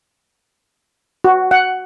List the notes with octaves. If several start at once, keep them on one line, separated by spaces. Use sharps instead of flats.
F#4
F#5